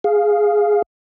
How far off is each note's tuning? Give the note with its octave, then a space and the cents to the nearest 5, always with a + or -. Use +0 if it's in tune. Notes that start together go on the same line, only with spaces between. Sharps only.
G#4 +0 F5 +0